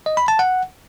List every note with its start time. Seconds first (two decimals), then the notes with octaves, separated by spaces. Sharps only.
0.06 D#5
0.17 B5
0.28 A5
0.39 F#5